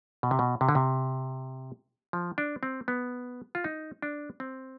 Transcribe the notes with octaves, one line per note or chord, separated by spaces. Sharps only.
B2
C3
B2
C3
D3
C3
F3
D4
C4
B3
F4
D#4
D4
C4